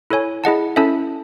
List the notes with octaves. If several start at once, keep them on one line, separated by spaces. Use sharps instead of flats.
E4 A4 C#5 G#5
E4 G#4 D#5 F#5 A5
C#4 E4 A4 E5 A5